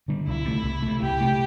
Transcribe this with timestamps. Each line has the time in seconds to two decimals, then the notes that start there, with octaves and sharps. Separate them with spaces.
0.08 D3 G3
0.27 C2 E4
0.45 C3 A3
0.64 C2
0.82 A3
0.88 C3
1.02 C2 G4
1.21 C3 A3